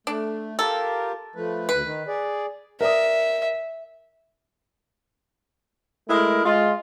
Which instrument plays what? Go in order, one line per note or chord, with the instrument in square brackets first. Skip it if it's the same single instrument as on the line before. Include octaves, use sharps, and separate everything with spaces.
[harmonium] A3 [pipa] D4
[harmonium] F4 G4 A#4 [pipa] A4
[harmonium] F3 A3 B4
[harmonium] D2 [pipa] B4
[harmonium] D#3
G#4 D5
[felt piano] A#4 D5 D#6 [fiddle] E5
[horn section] G#3 A3 E4 A#4
G#3 F4